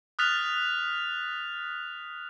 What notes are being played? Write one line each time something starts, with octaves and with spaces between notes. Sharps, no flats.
D#6 F6 F#6 A6 B6 F7